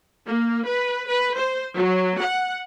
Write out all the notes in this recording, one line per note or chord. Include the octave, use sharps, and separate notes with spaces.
A#3
B4
B4
C5
F#3
F#5